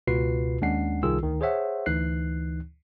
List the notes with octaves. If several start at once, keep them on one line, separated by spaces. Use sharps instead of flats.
C#2 B2 F4 F#4 B4 C7
D#2 G#3 C#4 D4 F#5 C7
C2 D#3 F4 G#4 E6
D2 D#3
G#4 C5 C#5 E5 F#5
D2 E3 D#4 F#6 C7